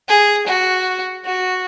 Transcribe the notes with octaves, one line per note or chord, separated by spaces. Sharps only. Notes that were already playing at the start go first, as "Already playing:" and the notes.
G#4
F#4
F#4